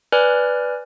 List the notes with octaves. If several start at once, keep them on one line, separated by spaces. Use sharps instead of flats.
B4 D5 G#5 F6 F#6